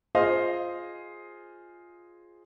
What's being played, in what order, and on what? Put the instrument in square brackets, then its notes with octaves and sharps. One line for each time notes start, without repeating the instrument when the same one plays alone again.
[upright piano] F4 G#4 C5 D#5 F5